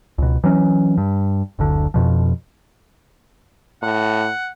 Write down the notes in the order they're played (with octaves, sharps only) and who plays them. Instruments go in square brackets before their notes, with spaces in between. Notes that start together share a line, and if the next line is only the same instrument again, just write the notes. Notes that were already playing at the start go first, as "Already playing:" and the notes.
[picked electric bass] C#2 B2
E3 F#3 C#4
G2
F#1 D2 D3
F2 B2 F3
[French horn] A2 [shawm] F#5